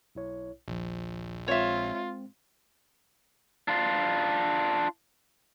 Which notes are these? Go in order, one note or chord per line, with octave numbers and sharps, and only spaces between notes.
B1 E4 C#5
A#1 D#2 F3
G#3 C4 F4 C#5 E5
D4 F4